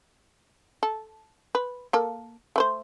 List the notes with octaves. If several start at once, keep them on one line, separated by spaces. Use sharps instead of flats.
A4
B4
A#3 A4
A3 B4 C5